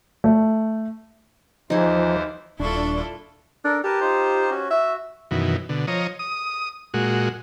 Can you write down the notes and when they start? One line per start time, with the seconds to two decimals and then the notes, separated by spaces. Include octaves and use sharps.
0.24 A3
1.70 D#2 E3 F3 D#4 G#4 C5
2.60 D#1 D4 E4 F4 A4 C6 C#6
3.65 D4 A4 A#4
3.84 G4 A#4 B4 A5
4.01 D#4 F4 C5
4.50 C#4 F#4
4.71 F#4 E5
5.31 F#2 B2 D#3 E3
5.69 B2 D3
5.87 F3 C#5 D#5 A#5
6.19 D#6
6.94 A#2 G#3 F#4